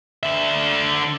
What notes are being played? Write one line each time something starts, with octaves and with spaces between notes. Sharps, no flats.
D3 E5